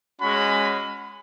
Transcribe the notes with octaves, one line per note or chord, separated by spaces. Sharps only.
G#3 C#4 F#4 B5